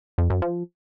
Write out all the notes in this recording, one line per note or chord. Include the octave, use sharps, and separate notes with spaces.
F2
F#2
F3